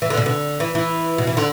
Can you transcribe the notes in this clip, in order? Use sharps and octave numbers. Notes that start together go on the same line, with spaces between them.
E3
D3
B2
D3
E3
E3
B2
E3
D3